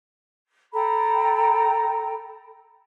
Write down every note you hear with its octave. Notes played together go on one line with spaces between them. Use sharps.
A4 G5 A#5 B5